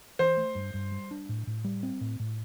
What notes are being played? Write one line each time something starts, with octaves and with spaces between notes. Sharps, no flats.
E3 C5
A3
G2
G2
G3
D4
A2
A2
G3
C4
A2
A2